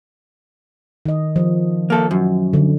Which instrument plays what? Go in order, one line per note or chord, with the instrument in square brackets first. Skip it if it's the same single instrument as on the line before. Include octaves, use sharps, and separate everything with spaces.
[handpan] D#3 D#5
F3
[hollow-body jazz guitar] A#3 A4
F#2
[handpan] D3